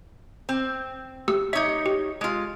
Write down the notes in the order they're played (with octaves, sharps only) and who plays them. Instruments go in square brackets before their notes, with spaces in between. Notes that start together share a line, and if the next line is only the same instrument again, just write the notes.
[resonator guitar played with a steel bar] C4
[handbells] A3 G4 E6
[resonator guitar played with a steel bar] D#4 C#5 [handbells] E5 G#6
[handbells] G4
[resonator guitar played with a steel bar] G#3 F4